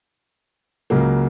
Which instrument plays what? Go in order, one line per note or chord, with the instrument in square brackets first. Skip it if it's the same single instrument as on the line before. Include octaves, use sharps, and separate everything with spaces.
[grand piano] C#2 C#3 F#3 A#3